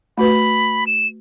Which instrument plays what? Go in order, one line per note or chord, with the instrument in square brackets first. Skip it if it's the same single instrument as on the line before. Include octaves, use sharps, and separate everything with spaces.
[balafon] A3 F#4 B4 [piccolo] B5
[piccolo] E7